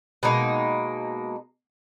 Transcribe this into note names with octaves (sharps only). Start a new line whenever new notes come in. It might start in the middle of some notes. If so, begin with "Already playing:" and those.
B2 G#3 A#3 D#4